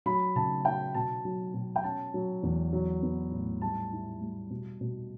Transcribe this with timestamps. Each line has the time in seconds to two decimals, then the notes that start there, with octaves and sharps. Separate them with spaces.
0.06 F#3 B5
0.36 C#3 A5
0.65 F#3 G5
0.95 B2 A5
1.25 F#3
1.54 B2
1.76 G5
1.84 C#4 A5
2.14 F#3
2.43 E2
2.73 F#3
3.03 B3
3.32 A2
3.61 G3 A5
3.92 E4
4.21 G3
4.50 B2
4.81 B2